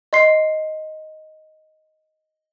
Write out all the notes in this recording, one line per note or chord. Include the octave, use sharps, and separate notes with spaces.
D#5 C6 C7